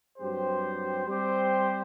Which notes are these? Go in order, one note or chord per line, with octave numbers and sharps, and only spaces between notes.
G2 F#3 C4 G4 C5
G3 C4 G4 C5